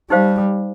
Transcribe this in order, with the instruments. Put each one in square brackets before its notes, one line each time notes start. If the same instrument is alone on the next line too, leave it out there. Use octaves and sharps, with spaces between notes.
[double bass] G3 [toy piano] D#4 G4 C5 F5